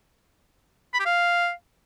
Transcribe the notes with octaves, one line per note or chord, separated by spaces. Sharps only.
B5
G4
F5